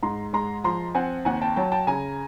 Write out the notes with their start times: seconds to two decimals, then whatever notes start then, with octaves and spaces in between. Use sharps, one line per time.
0.02 G#2 A#5 C6
0.33 G#3 A#5 C6
0.64 F3 A#5 C6
0.95 C4 F#5 G#5
1.25 D#2 F#5 G#5
1.42 G5 A5
1.56 F#3 G5 A5
1.72 G5 A5
1.87 C#3 G#5 A#5